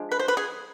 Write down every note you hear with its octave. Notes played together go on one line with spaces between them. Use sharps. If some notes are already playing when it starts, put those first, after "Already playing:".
Already playing: F3 G#3 D4
B4
C5
B4
G#4